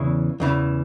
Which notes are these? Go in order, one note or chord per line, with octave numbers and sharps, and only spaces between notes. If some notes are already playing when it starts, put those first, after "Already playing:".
Already playing: E2 C#3 E3
E2 C#3 E3